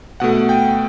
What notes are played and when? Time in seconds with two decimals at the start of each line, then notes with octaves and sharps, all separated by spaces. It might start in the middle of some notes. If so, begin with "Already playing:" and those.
0.20 B2 A3 F#5
0.49 G5